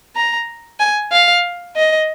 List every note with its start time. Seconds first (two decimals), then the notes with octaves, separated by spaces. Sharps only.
0.16 A#5
0.80 G#5
1.12 F5
1.76 D#5